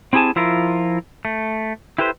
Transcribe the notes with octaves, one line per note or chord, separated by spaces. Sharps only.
C4 E4 G4 G#4 G#5 A5
F3 E4 F4 A#4
A3
E4 G4 A4 B4 C5